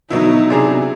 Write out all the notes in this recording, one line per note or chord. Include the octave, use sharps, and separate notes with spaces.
B2 D3 F#3 B3 D#4 E4
C3 D4 G#4 A#5